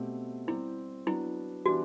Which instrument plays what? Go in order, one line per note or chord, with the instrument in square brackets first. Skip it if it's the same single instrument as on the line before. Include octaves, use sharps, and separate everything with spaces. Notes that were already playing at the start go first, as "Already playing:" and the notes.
Already playing: [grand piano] B2 A3 C4 G4
[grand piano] G3 C4 G4 [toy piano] E4
[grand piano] F#3 B3 D4 [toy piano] E4
[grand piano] E3 G3 B3 D4 G4 [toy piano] F#4